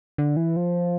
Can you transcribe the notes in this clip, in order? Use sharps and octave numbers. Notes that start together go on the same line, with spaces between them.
D3
E3
F3